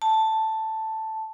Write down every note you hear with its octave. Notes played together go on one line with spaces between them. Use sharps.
A5